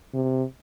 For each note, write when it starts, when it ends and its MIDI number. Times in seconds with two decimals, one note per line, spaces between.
0.14 0.43 48